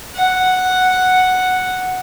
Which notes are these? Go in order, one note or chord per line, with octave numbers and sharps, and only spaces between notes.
F#5